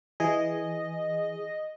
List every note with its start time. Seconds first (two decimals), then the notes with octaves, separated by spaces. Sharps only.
0.20 E3 G#4 D#5